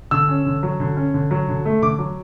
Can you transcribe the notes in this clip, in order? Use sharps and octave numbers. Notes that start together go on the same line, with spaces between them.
D3 E6
C#4
D3
F#3
D3
C#4
D3
F#3
D3
A3
D3 D6
F#3